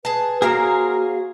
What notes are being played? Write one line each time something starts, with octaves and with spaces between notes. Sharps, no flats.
G#4 B4 A5
A#3 F#4 G#4 A#4 C5 F5 A#5